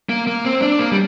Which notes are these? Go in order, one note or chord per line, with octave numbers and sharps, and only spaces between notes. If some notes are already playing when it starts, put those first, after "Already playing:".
A#3
A#3
C4
D4
A#3
G3